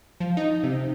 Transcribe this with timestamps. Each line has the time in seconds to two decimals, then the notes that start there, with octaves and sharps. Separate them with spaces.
0.20 F3
0.37 D#4
0.64 C3